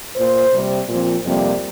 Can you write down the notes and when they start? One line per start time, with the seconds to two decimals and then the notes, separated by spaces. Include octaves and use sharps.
0.16 A#2 A#3 C5
0.52 C3 G3 C4
0.88 A#2 F3 C4
1.24 F2 C3 G3 A#3